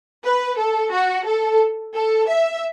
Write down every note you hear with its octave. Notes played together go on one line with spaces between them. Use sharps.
B4
A4
F#4
A4
A4
E5